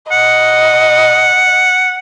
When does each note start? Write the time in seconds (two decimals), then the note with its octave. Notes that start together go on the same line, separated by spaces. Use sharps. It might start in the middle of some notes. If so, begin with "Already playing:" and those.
0.11 D#5 F#5